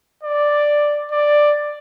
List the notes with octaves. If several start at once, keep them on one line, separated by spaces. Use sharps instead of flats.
D5
D5